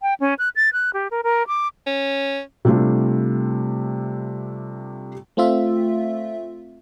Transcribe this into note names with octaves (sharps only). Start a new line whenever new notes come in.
G5
C#4
F#6
A6
F#6
G4
A#4
A#4
D6
C#4
C3 G3 A3 D4 F4
A3 C4 F4 E5